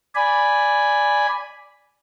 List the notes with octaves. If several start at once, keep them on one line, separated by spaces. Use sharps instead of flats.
D5 G#5 B5